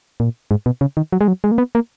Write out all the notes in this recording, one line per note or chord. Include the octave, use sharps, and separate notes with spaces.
A#2
G#2
B2
C#3
D#3
F#3
G#3
F#3
G#3
A#3
B3
A#3